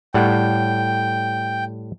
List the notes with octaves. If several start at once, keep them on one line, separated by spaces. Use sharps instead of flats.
A2 G3 F#5 G5